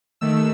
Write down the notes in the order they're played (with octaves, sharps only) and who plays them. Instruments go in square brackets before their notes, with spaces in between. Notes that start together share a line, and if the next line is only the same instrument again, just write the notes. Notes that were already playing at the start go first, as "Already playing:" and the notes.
[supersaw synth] D#2 D#3 A3 E6